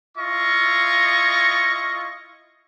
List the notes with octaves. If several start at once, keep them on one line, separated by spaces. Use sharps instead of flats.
E4 F4 D#5 C#6